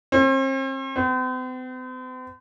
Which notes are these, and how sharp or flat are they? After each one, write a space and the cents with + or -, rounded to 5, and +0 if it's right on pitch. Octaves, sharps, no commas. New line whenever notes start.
C4 +40
C4 -45